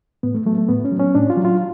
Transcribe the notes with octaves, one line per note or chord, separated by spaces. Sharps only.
A2 B3
A3
F#3 A3
A3
A2 B3
C#4
F#3
C#4
A2 D4
F4
F#3
F4